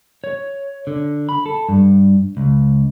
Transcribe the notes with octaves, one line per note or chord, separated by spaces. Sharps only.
C#5
D3
B5
A4
G2
C#2